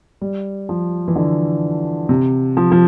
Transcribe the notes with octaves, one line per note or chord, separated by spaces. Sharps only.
G3
F3
E3
D3
C3
F3
F3